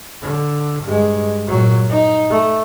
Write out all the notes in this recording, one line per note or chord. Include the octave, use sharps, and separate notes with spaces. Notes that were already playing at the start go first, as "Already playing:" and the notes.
D3
G2 G#3
A#2 F#3
D#4
A3